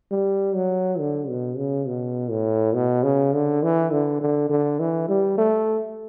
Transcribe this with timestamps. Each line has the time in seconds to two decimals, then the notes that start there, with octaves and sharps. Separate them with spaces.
0.11 G3
0.55 F#3
0.99 D3
1.29 B2
1.57 C#3
1.87 B2
2.30 A2
2.74 B2
3.03 C#3
3.34 D3
3.63 E3
3.92 D3
4.21 D3
4.50 D3
4.80 E3
5.09 G3
5.38 A3